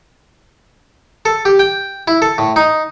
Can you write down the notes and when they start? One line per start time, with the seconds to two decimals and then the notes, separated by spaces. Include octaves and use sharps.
1.25 A4
1.45 G4
1.59 G5
2.08 E4
2.22 A4
2.38 A2
2.56 D#4